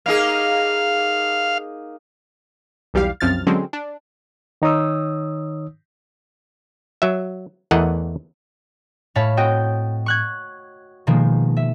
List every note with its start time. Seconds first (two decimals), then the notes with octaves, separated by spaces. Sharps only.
0.06 A#3 D#4 G#4 F5
2.94 B1 E2 G3 G4 F5
3.20 C2 F#2 C3 F3 F6 A6
3.47 D3 F#3 G#3 C4 C#4
3.73 D4
4.62 D#3 D#4 C#5 D#6 E6
7.02 F#3 E5
7.71 E2 E3 A3 A#4 D#5 F#5
9.15 A2 C#5 F5 A5 B5
9.37 C4 F#4 D#5 G5
10.06 C#6 F#6 G#6
11.07 B2 D#3 F3 G#3 A#3
11.57 E5